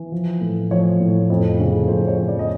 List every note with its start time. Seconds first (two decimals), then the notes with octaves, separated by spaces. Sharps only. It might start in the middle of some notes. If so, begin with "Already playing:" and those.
Already playing: E3
0.12 F3
0.41 A2
0.71 F3 C#5
1.00 A2
1.30 F2
1.60 C#3
1.88 F2 C5
2.08 C#5
2.18 F2
2.28 D5
2.39 D#5